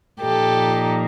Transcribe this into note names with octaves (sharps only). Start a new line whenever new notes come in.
A#2 F3 A#3 D#4 G4 A4